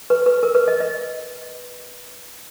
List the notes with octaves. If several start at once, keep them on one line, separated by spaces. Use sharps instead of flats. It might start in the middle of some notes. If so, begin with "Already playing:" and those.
B4
B4
A#4
B4
D#5
D#5